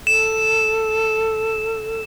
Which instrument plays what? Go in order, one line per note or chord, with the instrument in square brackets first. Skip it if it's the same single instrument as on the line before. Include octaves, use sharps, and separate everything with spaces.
[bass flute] A4 [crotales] E7